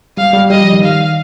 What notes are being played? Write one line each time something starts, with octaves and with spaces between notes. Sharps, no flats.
G3 F5
G3
G3 D#5
F3
D#3
F5